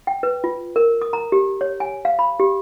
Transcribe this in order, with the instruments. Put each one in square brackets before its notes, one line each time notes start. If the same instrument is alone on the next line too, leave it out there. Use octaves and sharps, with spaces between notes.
[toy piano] G5
B4
F4
A#4
D#6
A#5
G4
C#5
G#5
F5
B5
G4